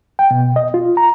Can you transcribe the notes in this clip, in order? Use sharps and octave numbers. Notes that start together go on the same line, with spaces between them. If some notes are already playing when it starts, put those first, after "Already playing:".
G5
B2
D#5
F4
A#5